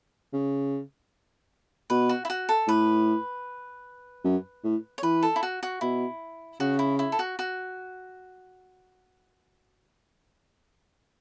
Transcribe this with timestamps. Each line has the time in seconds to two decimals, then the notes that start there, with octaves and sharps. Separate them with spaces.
0.33 C#3
1.90 B2 B4
2.09 F#4
2.25 E4
2.30 F#4
2.49 A4
2.68 A2 B4
4.25 F#2
4.64 A2
4.98 C#5
5.03 E3 B4
5.22 A4
5.36 E4
5.43 F#4
5.63 F#4
5.81 B2 E4
6.60 C#3 F#4
6.79 E4
6.99 E4
7.12 A4
7.19 F#4
7.39 F#4